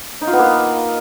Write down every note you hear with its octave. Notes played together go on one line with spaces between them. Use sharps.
D#4
F4
B3
A#3